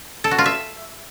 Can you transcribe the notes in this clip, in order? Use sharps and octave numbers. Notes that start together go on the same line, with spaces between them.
A4
F#4
F4
E5